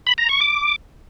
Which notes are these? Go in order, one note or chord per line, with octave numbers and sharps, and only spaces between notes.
B5
A#5
C#6
D6